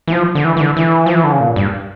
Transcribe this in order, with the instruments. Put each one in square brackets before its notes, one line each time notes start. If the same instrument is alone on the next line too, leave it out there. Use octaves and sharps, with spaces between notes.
[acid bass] E3
F3
D3
E3
E3
D3
E3
F3
E3
D3
C#3
A#2
G2